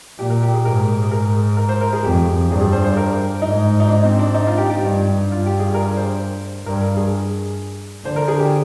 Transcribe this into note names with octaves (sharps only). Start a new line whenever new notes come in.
A#2 G4
A#4
G4
G#4
G#2 A#4
G#4
G#2 A#4
A#4
C5
A#4
G#4
F2 G4
G2 G#4
G#4
C5
C5
A#4
G#2 D#4
D#4
D4
C4
D4
D#4
F4
G4
G4
G2
G2 F4
G4
G#4
A#4
C5
G2 A#4
A#4
G#4
D3 C5
A#4
G#4
G4